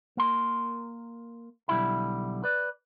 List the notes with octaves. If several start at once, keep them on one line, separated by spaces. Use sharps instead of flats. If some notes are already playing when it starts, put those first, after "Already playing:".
A#3 A#4 C6
B1 D3 G3 E4 E5 B5
B4 D5